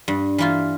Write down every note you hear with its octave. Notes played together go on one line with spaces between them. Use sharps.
G2
E3 A#3 F4